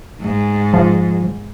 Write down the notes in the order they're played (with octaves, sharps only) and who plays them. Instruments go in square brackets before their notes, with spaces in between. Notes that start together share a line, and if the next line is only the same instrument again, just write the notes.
[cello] G#2
[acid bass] F3